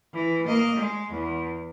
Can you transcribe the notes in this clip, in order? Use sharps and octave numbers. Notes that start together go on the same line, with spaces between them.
E3
A#3 D#5
G#3
E2